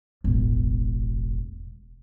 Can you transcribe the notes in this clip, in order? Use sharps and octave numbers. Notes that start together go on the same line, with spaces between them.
E1 A1